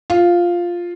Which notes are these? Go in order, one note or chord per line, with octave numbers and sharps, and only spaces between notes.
F4